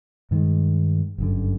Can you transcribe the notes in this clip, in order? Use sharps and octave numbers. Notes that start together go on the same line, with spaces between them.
G2 D#3 G#3
G1 F#2 D3